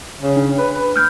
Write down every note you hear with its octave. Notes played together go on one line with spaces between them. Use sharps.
C#3
D4
B4
B4
F6 G6